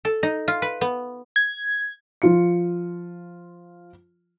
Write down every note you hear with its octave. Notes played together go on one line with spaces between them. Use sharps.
A4
D#4
F4
B4
B3
G#6
F3 F4 C#7